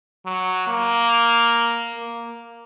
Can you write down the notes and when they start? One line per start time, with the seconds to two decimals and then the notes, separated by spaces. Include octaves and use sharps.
0.26 F#3
0.68 A#3
1.95 A#3